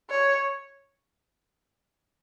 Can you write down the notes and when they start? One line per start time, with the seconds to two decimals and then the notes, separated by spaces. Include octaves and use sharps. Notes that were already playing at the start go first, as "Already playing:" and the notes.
0.10 C#5